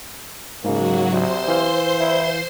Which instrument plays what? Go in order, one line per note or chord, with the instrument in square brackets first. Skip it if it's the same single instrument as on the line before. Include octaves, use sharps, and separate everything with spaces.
[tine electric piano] G#2 C#3 [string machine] F#3 F#4 [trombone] A#3
[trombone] C3 [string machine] C5 C6
[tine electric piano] E3 F5
[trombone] E4